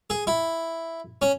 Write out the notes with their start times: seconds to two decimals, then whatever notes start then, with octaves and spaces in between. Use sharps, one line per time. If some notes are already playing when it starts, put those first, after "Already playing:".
0.10 G#4
0.27 E4
1.22 C#4